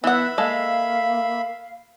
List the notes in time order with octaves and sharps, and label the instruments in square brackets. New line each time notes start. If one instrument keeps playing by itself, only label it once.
[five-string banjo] E3 F#5 [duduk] B3 [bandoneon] E5 B5 [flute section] E6
[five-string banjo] G#3 A4 [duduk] A#3 [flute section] F5